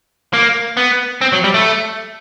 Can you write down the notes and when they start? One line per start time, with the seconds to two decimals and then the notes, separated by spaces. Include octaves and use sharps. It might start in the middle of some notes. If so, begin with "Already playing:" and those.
0.33 A#3
0.77 B3
1.21 C4
1.32 F#3
1.44 G3
1.54 A3